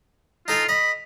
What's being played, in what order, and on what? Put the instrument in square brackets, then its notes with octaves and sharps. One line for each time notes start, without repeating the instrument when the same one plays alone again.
[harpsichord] D#4 A4 G#5 [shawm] F4
[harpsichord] D#5 [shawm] B5